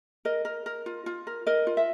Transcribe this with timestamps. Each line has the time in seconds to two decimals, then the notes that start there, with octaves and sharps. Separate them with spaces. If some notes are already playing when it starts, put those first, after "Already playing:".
0.25 A#4 D#5
0.45 A#4
0.66 A#4
0.86 F4
1.06 F4
1.27 A#4
1.46 A#4 D#5
1.67 F4
1.77 E5